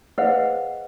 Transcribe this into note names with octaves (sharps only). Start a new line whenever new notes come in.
G#4 B4 C5 D#5 F5 F#5